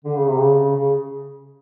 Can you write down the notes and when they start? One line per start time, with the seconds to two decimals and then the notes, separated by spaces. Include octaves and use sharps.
0.05 D3
0.16 C#3
0.28 C3
0.40 C#3
0.76 C#3